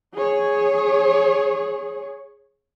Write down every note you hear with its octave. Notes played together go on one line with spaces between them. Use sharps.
G#4 C#5